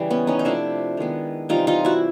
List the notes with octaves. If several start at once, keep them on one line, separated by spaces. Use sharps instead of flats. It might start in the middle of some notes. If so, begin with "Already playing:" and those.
Already playing: C#3 E3 G3
B3 C#4
C#4 D#4
D#4
C3 F3 A3 D4 E4
D#3 G#3 B3
C3 E3 G3 D#4 F4
D#4 F4
E4 F#4